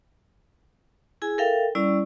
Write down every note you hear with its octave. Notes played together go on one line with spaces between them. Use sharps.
E4 G#4 G#5
A4 A#4 E5 F5 G5
G3 C#4 E4 D5